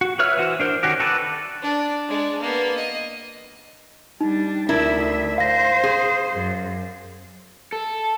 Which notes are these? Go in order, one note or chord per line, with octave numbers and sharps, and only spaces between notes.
F#4
B4 C#5 E5 F6
E3 F#4 C5
D4 A#4 C5
D#3 C#4 F#4 G4
F#4 A4 B4 D5
D4
G#3 D4
A#3 B3
D#5
G3 D4 D#4
D2 D4 E4 A#4 E5
C5 F5 A#6
G#4
F#2
A4